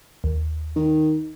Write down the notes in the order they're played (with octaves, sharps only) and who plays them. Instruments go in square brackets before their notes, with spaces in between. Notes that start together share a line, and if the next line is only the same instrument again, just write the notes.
[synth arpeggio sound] D#2
[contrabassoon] D#3